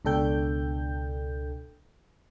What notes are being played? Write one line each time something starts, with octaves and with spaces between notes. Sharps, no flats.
C#2 B2 D4 A4 G5 G6